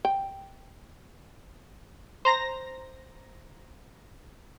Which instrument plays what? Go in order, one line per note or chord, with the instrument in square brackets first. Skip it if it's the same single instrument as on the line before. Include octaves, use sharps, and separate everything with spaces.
[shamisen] G5
[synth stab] C5 A#5 A#6